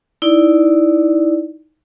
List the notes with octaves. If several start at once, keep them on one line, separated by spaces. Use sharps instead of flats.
D#4 E4 D5